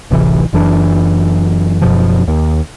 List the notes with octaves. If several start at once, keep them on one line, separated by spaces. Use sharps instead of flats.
D1 A1 C3 E3
F#1 F#2 E3 D4
F#1 F#2 B2 F3
D#2